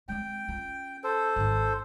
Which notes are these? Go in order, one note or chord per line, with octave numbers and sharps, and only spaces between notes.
G#3 C4 G5
C#4 F4
A4 C5
G#1 D#2